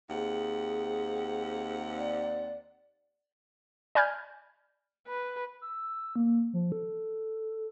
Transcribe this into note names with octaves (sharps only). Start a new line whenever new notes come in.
D#2 C4 G#4 F#5
D5
D5 G#5 B5 F6 G6 G#6
B4
E6
A#3
F3
A4